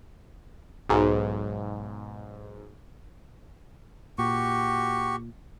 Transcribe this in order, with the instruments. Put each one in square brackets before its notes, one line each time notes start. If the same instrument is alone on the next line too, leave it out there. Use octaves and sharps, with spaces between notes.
[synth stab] B1 G#2
[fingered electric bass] A#2 [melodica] F#4 G4 C#6